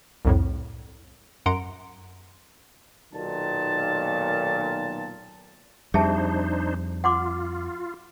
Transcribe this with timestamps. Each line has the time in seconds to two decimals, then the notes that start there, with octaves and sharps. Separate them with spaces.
0.25 C2 F2 A2
1.46 F#2 F#5 A#5 C6 D7
3.14 B1 A#2 D#3 A5
5.94 F2 G3 D4 D#4 G#4 C5 E5 A5
7.04 F4 F#5 C6 D6